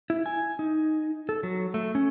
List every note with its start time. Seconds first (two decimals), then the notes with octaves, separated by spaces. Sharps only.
0.10 E4
0.26 G#5
0.59 D#4
1.29 A4
1.43 F#3
1.74 A3
1.95 C#4